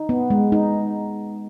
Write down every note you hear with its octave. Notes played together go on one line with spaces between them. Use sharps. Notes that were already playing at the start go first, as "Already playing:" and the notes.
Already playing: D#4
B3
G#3
D#4